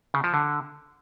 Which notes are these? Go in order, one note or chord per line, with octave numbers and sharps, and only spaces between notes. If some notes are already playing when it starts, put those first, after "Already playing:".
C#3
F3
D3